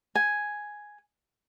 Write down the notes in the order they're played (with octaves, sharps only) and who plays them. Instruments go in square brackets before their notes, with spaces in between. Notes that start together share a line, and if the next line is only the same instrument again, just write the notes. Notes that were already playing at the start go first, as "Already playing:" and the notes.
[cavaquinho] G#5